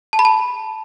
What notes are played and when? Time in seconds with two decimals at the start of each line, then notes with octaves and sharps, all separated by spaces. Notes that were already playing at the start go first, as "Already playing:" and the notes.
0.13 A5
0.19 B5
0.25 A5